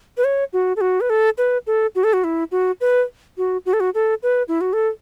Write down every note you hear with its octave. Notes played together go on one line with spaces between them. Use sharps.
B4
C#5
F#4
A4
F#4
B4
A4
B4
A4
F#4
A4
F#4
E4
F#4
B4
F#4
F#4
A4
F#4
A4
B4
E4
F#4
A4